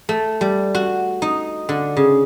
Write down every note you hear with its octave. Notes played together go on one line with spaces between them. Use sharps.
A3
G3
F#4
D#4
D3
C#3